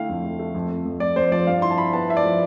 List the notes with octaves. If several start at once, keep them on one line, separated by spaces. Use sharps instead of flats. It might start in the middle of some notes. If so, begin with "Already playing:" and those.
Already playing: D3 A3 E4 F5 G5
F2
A3
A3
F2
F2
F2
F2 D5
F2 C5
F3 D5
G2 F5
E4 C6
A5
E4 B5
B3 A5
E4 E5
D5
F3